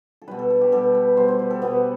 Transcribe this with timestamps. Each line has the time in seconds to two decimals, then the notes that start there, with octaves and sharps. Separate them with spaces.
0.22 A4
0.28 B2 G3 B4
0.39 A4
0.50 A4
0.61 G4
0.72 B2 G3 A4
0.95 B4
1.17 B2 G3 C5
1.28 C5
1.39 B4
1.50 A4
1.62 B2 G3 B3